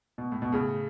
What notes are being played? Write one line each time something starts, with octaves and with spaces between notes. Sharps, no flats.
B2
A2
B2
A2 C#3